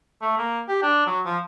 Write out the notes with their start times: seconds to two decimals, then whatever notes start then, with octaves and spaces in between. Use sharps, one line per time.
0.22 A3
0.38 A#3
0.69 G4
0.82 D4
1.06 F#3
1.25 F3